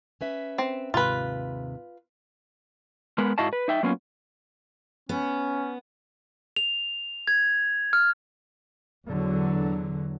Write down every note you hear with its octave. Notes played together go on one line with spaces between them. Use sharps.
C#4 B4 E5
C4
D#2 G#2 C3 F4 B4
G#3 B3 A#4 B4
G#2 E4 F#4 D#5 F5 A5
B4
D#4 E5 G5
F#3 A#3 B3 C#4 F4
B3 C#4
F7
G#6
F6
E2 D3 F#3